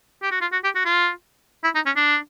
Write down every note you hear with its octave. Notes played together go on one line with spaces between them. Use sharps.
G4
F#4
F4
F#4
G4
F#4
F4
E4
D#4
C#4
D4